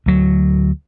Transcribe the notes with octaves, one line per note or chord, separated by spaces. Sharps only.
D2 F#3